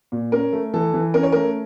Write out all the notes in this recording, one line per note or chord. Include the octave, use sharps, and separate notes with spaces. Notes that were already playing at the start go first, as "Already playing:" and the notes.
A#2
C#4 A#4
A3
E3 A4
E3
C#4 A#4
C#5
A3 A#4